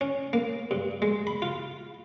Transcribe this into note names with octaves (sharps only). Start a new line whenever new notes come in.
C#4
A#3
G2
G#3
B5
F4